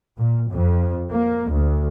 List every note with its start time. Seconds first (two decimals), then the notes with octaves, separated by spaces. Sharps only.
0.17 A#2
0.51 F2
1.11 A#3
1.50 D2